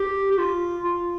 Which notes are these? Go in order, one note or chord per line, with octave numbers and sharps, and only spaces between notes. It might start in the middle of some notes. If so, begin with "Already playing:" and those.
Already playing: G4
G4
F4
F4